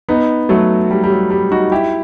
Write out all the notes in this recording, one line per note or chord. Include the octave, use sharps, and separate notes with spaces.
B3 D#4
F#3 A3
G3
G3
F#3
G3
D#4 F#4
E4 G4